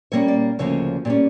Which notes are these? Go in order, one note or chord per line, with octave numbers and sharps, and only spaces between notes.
A#2 G3 A#3 C#4 C#5
D5
D2 C#3 F3 A#3 C#4 C#5
A#2 G3 C#4